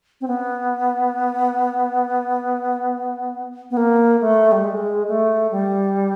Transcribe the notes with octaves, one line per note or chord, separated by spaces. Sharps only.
C4
B3
B3
A#3
A3
G3
G#3
A3
G3